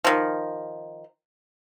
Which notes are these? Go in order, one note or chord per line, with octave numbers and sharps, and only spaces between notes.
D#3 F3